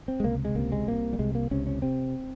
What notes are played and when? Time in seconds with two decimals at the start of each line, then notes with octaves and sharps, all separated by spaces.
0.08 C4
0.20 G#3
0.24 C#2 C3 A#3
0.45 G#3
0.55 C#2 C3 A#3
0.72 G#3
0.87 C2 C3 A#3
1.13 G3
1.19 C2 C3 G#3
1.35 A#3
1.51 C#2 C3 C#4
1.67 C#4
1.82 C3 C4